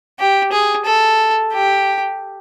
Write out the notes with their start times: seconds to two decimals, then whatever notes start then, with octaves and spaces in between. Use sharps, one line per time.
0.19 G4
0.52 G#4
0.85 A4
1.53 G4